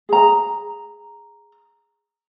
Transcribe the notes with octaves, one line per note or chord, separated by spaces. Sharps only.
G#4 A#5